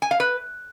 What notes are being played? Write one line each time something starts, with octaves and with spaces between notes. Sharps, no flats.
G#5
F5
B4